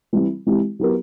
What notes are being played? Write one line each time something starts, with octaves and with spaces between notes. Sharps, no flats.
E3 G3 C4 E4
E3 G#3 C4 E4 G4
F#3 B3 E4 G4 A#4